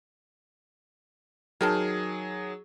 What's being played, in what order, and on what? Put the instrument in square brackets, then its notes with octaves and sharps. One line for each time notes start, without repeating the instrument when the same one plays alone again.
[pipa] D#3 G5 A5 [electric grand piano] F#3 G#4